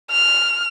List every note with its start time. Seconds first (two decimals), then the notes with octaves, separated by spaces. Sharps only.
0.11 F6